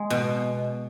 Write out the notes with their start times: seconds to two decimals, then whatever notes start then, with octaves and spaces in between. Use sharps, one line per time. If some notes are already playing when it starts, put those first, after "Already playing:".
Already playing: G#3
0.10 B2